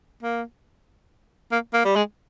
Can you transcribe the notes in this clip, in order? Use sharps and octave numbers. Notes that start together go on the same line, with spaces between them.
A#3
A#3
A#3
G3
G#3